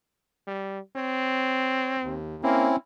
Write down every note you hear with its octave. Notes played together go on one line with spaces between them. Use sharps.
G3
C4 C#5
D#2
A#3 C4 C#4 E4